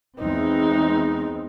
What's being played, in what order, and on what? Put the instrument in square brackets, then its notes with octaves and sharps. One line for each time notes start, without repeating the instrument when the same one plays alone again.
[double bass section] E2 G#3 C4 [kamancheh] D#4